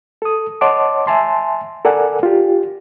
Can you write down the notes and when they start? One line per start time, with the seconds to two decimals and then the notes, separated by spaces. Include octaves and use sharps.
0.22 A4 D#6
0.61 C#5 D#5 F#5 A5 C6 D6
1.07 E5 G#5 A5 C6
1.85 A4 A#4 D5 F#5 G#5
2.23 F4 G4